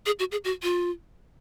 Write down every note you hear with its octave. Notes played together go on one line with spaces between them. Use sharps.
G#4
F#4
G#4
F#4
F4